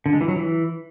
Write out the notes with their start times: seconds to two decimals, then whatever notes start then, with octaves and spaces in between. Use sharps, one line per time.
0.06 D3
0.13 G#3
0.21 E3
0.28 F#3
0.36 E3